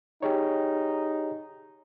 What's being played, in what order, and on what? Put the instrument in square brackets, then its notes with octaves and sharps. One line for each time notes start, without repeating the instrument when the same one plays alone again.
[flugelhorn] D#4 [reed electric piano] G4 G#4 C#5